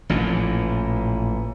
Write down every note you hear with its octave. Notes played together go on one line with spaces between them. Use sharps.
A1 A#2 E3 F3